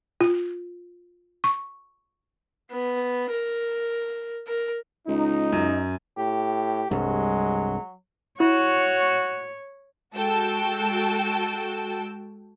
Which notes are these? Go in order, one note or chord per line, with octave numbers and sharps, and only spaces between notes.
F4
C#6
B3
A#4
A#4
C#2 D#4
F#2
A2 G4
C2 G2 F#3 G#3
E4 F#4 C#5
G#3 F#4 A4 G5 A5 E6